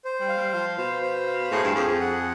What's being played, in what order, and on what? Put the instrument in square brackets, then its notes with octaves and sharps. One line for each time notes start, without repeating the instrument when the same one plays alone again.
[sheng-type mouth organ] C5
[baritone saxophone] G3
[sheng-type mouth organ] F5
[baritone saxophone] G3
[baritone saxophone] F3 [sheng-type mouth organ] F5
[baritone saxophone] B2 [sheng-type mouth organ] C5
[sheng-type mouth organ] C5
F5
[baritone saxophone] A2 [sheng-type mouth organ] G#4
[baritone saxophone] G2
[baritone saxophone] F2 [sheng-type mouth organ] G#4
[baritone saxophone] F2
[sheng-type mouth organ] F#5